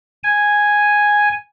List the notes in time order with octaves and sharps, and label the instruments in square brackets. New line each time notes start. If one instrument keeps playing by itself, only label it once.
[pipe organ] G#5